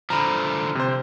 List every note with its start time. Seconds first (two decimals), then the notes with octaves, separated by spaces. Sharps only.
0.10 D3 F3 A#5 B5
0.75 C3 C5